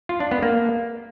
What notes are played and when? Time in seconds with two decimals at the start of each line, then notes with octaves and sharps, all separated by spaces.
0.09 F4
0.20 D4
0.31 B3
0.43 A#3